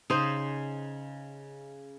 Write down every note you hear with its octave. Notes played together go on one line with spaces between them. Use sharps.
C#3 D#4 C5 C6